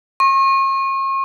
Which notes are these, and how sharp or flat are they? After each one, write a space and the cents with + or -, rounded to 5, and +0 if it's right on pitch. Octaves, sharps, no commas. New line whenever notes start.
C#6 -40